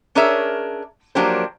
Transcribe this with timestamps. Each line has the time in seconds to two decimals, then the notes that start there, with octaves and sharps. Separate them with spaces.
0.15 C#4 D4 G#4 A#4 C#5 E5
1.15 F3 F#3 A#3 D4 G4 C5